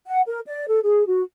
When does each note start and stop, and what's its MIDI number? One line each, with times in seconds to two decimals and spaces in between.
0.06 0.21 78
0.26 0.40 70
0.46 0.66 74
0.68 0.80 69
0.83 1.05 68
1.07 1.22 66